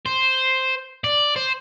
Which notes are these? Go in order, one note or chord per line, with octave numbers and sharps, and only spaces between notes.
C5
D5
C5